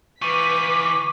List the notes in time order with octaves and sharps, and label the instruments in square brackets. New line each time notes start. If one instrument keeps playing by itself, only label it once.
[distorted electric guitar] E3 F3 [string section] B4 B6 [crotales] C#6 D#7 [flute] D6